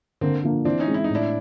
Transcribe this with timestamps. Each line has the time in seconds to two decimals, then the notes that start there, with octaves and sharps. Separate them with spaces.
0.21 D3 A#3 C4
0.43 F3 A#3 D4
0.65 E3 C4 D4
0.80 C#4 D#4
0.88 G#3 C4
0.94 E4
1.04 D#4
1.09 A2
1.15 D4 E4